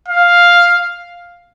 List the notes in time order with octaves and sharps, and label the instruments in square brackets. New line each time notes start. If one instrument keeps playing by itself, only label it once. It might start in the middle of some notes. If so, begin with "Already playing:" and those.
[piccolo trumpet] F5